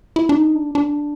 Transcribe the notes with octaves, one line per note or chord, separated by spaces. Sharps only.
E4
D4
D#4
D4
D4